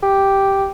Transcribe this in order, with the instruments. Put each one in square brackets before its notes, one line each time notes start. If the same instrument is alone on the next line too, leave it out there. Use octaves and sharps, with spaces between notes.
[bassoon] G4